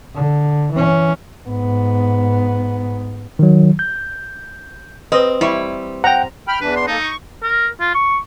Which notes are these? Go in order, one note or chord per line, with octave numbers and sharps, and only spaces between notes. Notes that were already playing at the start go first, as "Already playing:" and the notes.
D3
E3 C#4
G#2 B3
D#3 F#3
G6
C4 G4 B4 D#5 B5
G3 E4 C#6
C5 F#5 G5 A#5
G5 B5 F6
E2 E3 D4 B4
C6
A#3 D#4 A4
C#6
A#4
F4
C#6